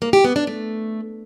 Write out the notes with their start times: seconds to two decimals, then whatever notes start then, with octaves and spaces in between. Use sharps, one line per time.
0.02 A#3
0.13 G4
0.24 B3
0.36 D4
0.47 A3